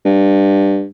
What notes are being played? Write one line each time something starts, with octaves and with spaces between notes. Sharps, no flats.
G2